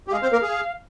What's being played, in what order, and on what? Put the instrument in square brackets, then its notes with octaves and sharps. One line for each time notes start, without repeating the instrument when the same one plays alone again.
[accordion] G4
[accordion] G#3 G#4 [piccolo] F5
[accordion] C4 C5
A#3 A#4
G#4